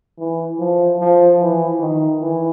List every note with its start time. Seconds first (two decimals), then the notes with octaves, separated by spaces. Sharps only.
0.18 E3
0.59 F3
1.00 F3
1.40 E3
1.80 D#3
2.21 E3